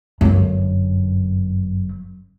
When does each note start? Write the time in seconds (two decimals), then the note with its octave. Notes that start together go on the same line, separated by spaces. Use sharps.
0.21 G1 F#2